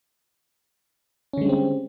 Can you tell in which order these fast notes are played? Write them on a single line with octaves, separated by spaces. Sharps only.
C#4 D3 G#3 G3 C4